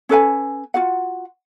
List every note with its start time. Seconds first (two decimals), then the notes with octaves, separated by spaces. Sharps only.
0.09 C#4 A4 B4 G#5
0.74 F4 F#4 F#5